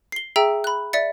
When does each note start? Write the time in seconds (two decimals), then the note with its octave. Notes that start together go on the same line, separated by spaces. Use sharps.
0.12 C7 G7
0.36 G#4 E5 G5 A#5 E6
0.64 B5 F#6
0.93 D5 E5 A6 C#7